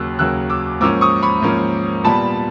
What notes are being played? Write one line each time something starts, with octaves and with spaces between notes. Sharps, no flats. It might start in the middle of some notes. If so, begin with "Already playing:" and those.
Already playing: D#2 C#3 F#3 A#3 E6 F#6
D#2 C#3 F#3 A#3 E6 F#6
D6 E6
G#2 F3 A#3 C#4 D6 E6
C#6 D#6
B5 C#6
G#2 F3 A#3 C#4
A#2 G3 B3 A5 B5